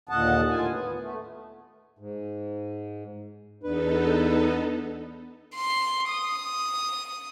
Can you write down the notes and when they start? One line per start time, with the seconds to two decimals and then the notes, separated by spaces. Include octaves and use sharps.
0.09 D#2 A#2 D3 D#5 F#5 A5
0.50 A2 F4 G#5
0.68 B3
1.00 A3
1.99 G#2
3.64 E2 B3 D4 D#4 A4 B4
5.55 C6
6.10 D#6